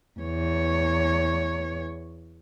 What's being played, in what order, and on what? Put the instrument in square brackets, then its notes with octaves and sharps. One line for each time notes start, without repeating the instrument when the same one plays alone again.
[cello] E2 C#5